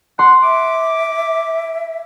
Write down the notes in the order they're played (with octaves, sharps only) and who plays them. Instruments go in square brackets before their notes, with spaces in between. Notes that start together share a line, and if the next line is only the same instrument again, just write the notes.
[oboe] F#5 [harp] C6
[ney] E5 [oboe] D6